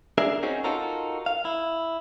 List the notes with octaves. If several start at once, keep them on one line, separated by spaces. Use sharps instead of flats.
D4 G#4 A#4 E5
C4 C#4 D#4 F#4 G#4
D#4 F4 F#4 A4 A#4
F5
E4